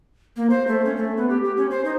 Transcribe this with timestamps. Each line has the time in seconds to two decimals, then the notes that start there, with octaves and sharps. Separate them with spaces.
0.37 A#3
0.50 C5
0.67 A3
0.85 C#4
0.97 A3
1.17 B3
1.29 G4
1.44 G4
1.57 C#4
1.71 C5
1.85 D#4